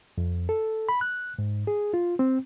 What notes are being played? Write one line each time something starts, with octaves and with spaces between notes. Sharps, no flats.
F2
A4
B5
F#6
G#2
G#4
F4
C4